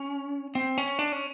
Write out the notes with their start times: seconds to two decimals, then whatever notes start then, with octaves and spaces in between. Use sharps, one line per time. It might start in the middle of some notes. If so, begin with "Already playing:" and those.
Already playing: C#4
0.55 C4
0.78 C#4
0.99 D4
1.12 C#4